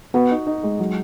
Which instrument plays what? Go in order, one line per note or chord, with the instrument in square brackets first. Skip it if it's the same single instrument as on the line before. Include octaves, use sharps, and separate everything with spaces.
[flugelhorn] B3 [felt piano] F#4
[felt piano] D#4
D#4
G#3
F#3